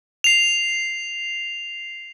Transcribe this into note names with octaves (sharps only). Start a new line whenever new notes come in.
C7 F7